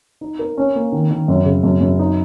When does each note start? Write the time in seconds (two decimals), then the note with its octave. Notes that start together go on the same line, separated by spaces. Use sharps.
0.21 D#4
0.39 A#4
0.57 C#4
0.75 A#3
0.92 D#3
1.11 D#3
1.28 F#2
1.46 C#3
1.63 F#2
1.81 F#2
1.99 D#4